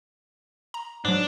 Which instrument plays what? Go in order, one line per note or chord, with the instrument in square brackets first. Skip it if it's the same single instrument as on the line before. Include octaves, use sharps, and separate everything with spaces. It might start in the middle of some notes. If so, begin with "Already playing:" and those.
[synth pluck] A#5
[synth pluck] G#2 F#3 [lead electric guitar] D4